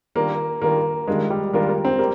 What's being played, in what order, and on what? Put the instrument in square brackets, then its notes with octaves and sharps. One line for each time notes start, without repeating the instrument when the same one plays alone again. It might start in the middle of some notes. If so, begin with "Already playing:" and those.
[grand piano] D#3 G3 D4 F4 A#4 [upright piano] A#3
[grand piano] D#3 G3 D4 F4 A#4 [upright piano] A#3
[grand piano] D#3 G3 D4 F4 A#4 [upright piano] G#3
[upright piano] G3
[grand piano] D#3 G3 D4 F4 A#4 [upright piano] A#3
[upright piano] A#3
C4
[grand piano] G3 [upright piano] A#3